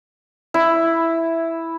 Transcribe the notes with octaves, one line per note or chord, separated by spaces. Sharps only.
E4